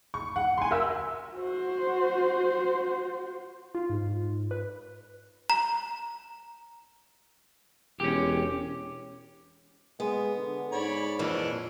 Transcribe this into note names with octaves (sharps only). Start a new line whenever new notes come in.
C#6
F#5
G#5 C6
A#4 E5 E6
F#4 C5
F4
G#2
B4
A#5
E1 C#4 G4
G#3 B3
D3
G#2 C#5 D5 B5
F2 A#2 E3 C#4 D4